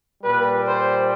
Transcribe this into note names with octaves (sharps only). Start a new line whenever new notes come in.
A#2 G3 B4
C5